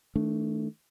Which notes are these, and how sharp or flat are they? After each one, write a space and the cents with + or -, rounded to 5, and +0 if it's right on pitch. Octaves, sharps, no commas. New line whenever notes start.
D#3 +40 A3 -5 D4 +0